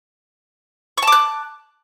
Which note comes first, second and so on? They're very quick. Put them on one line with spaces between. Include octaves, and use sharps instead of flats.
C#6 A5 D6 F#6